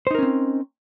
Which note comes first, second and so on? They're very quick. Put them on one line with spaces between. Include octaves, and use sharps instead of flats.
C5 D#4 A#4 C#4 C4